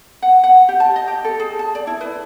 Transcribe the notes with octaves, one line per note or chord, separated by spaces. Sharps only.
F#5
F#5
G4
A5
D#5
G4
A4
G#4
A5
D5
E4
B4